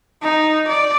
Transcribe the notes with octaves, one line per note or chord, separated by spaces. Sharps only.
D#4
D5